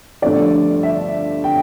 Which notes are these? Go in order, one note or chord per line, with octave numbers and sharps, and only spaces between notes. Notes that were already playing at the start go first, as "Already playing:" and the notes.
G2 D3 F3 A3 D5
E5
G5